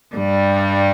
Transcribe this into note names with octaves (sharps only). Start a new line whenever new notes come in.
G2 G3